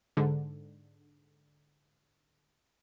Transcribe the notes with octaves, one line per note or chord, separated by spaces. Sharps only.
G#2 D3